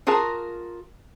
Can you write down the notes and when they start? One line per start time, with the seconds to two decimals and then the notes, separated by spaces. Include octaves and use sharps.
0.07 F4 F#4 G#4 A#4 A5